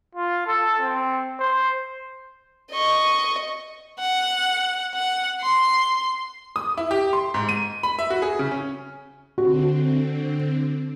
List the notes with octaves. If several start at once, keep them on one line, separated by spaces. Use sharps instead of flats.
F4
A4
C4
C5
D#5 C#6
F#5
F#5
C6
D#6
E4
G4
C6
G#2
D#7
B5
E5
F#4
G#4
C#3
C#4
D3 C4 F#4